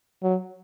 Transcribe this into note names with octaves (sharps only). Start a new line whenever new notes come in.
F#3